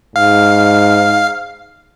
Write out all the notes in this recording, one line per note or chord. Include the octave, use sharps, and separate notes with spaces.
G#2 F5